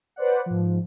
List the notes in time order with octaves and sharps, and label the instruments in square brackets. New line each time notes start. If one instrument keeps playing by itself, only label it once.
[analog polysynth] B4 C5 D5 F#5
G#2 F3